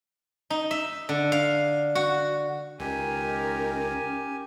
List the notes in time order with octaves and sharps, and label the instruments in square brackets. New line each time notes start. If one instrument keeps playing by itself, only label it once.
[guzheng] D#4
E5
D3
F5
F#4
[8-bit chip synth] C#2 [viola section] D#3 A#4 [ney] C#4 [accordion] G4 G#5